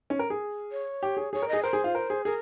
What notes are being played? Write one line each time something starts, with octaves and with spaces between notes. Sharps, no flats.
C#4
A#4
G#4
C#5
G4
G#4
G#4 C#5
A#4
G#4 D#5
A#4 C5
G#4
F4
A#4
G#4
G#4 A#4